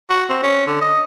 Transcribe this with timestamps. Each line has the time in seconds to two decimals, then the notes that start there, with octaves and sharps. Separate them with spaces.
0.10 F#4
0.30 C4
0.43 C#4
0.67 D3
0.81 D#5